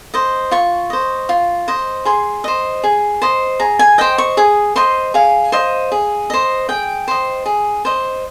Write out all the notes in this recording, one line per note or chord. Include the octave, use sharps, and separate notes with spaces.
C5 D#5
F4 C#6
C5 D#5
F4
C5 D#5
G#4 C6
C5 D#5
G#4
C5 D#5
G#4 A#5
G#5
C5 D#5 G5
C#6
G#4 D#6
C5 D#5 C6
G#4 F5
C5 D#5
G#4
C5 D#5
G#4 G5
C5 D#5
G#4
C5 D#5